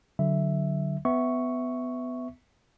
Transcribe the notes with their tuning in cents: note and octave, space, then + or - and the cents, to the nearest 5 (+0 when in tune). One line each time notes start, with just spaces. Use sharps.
D3 +0 F#3 +10 E5 +0
B3 +20 E5 +0 C#6 +0